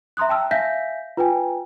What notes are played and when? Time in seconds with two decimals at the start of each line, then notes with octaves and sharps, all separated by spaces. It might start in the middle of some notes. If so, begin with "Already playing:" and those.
0.17 E5 A#5 C6 D#6 F#6
0.29 G5 A5 E6 F6
0.51 E5 F5 G#5 G6 A#6 B6
1.17 F4 B4 G5 G#5